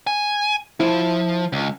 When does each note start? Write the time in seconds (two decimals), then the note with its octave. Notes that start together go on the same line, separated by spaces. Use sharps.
0.07 G#5
0.80 F3 E4
1.53 C#2